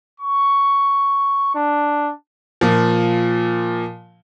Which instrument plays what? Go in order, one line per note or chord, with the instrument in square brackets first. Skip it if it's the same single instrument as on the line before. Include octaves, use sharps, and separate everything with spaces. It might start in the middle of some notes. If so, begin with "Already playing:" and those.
[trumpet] C#6
D4
[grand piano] A#2 F3